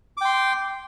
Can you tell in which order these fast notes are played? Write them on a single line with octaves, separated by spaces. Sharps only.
D6 G5 C6